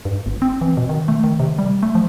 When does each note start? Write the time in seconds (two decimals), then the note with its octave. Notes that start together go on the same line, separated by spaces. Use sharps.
0.05 G2
0.26 G1
0.42 C4
0.61 E3
0.77 B2
0.89 D#3
1.08 A3
1.24 D#3
1.40 C3
1.59 G3
1.83 A3
1.95 F3